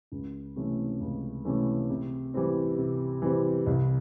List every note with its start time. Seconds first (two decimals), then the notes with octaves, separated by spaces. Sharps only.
0.12 C#2
0.56 C3 E3 A3 C#4
1.01 C#2
1.45 C3 E3 A3 C#4
1.90 C3
2.34 E3 G3 C4
2.78 C3
3.22 E3 G3 C4
3.66 C2